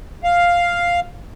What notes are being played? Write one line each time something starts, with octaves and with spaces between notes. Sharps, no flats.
F5